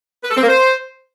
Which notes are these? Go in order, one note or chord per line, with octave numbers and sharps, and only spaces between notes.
B4
A4
C4
A#3
C5